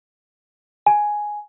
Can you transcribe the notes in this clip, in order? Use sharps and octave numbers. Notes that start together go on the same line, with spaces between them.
G#5